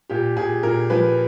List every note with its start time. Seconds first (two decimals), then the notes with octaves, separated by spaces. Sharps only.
0.10 A#2 G4
0.37 A#2 G#4
0.63 A#2 A#4
0.90 F3 B4